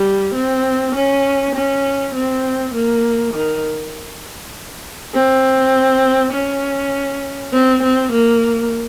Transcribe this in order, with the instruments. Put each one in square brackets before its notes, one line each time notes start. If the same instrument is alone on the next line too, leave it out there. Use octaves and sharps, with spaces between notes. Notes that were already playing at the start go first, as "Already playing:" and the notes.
Already playing: [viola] G3
C4
C#4
C#4
C4
A#3
D#3
C4
C#4
C4
C4
A#3